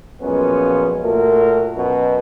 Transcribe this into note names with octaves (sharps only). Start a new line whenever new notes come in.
F#2 A#2 F3 G#3 B3 C#4
A#2 A3 F#4 A#4
F#2 B2